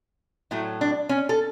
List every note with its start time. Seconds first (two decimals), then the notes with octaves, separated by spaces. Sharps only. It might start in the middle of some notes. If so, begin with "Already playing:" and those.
0.51 A2 F#3 A3 E4
0.81 D4
1.09 C#4
1.29 A4